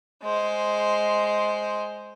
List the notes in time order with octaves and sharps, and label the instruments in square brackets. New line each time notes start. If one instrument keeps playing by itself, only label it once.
[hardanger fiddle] G#3 C5